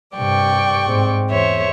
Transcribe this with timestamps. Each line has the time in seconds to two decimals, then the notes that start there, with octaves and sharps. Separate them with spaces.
0.17 G2 C3 D5 G5 C#6
0.86 G#2 C4
1.29 E2 C5 C#5 E5